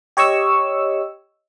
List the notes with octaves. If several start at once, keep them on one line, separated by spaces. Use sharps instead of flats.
G4 C#5 D#5 C#6 E6